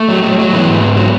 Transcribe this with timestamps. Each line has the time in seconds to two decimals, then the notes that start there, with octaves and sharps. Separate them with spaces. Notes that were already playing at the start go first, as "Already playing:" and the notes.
Already playing: A3
0.09 F#3
0.23 F#3
0.39 F#3
0.53 E3 B3
0.67 G#2
0.83 G#2
0.97 F#3